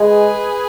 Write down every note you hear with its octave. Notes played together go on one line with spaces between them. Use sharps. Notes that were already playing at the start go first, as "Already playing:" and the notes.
Already playing: G#3 G#4 B4